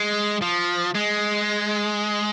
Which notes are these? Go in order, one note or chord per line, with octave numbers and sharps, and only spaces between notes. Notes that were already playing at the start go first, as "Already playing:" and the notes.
Already playing: G#3
F3
G#3